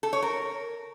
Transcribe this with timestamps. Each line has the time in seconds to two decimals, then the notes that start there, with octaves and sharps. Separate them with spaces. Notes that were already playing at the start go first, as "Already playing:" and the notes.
0.03 A4
0.13 C#5
0.22 A#4